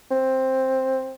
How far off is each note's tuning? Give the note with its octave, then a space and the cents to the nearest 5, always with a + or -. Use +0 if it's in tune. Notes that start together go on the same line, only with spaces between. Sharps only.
C4 +5